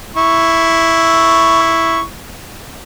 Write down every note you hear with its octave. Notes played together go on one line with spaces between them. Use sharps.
E4 C#6